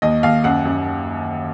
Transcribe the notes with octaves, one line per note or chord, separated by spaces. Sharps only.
D#2 D#5
D#2 F5
F#2 F#5
F#2